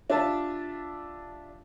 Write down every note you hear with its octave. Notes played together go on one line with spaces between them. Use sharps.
D4 F4 G4 E5 A5